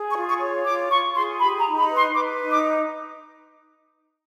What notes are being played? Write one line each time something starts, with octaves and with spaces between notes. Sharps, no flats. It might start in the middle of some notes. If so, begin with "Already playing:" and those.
Already playing: G#4
C#6
F4
C#6
C#5
F4 D6
F4 C#6
G#4 C6
G4 B5
A#5
D#4
B5
B4
C6
B4 D6
D#4
D6